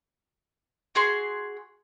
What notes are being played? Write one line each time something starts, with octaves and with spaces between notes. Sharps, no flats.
F#4 G#4 C6